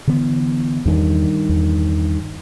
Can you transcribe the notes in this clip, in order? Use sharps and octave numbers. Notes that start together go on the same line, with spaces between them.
D3 E3 B3
E2 G2 D#3
E2